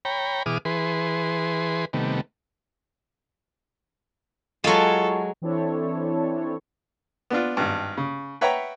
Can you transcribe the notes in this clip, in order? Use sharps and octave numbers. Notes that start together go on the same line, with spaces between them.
C#5 G5 A#5 B5
B2 E3 G#4 D6 D#6 F6
E3 G#4 B4 C6
C3 D#3 G3 A3 B3
F#3 G#3 F4 A4 C#5 A5
E3 C4 D4 E4 A4 C#5
B3 D4 F4
G#1 G2
C#3
B4 C#5 E5 F#5 G5 A#5